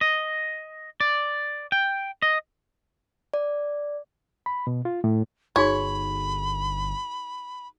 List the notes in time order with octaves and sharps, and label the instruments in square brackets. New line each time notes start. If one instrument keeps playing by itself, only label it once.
[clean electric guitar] D#5
D5
G5
D#5
[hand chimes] D5
[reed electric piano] B5
B2
F4
A2
[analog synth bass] G1 [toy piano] D#4 F#4 G#4 [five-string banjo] C#5 [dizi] B5